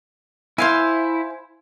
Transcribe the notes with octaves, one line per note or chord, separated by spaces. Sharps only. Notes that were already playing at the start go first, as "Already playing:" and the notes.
E4 C5 F5 G#5